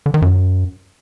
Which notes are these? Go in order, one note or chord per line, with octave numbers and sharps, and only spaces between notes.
D3
D#3
F#2